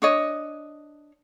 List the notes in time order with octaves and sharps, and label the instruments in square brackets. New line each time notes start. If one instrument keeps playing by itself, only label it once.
[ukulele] D4 C#5 D#5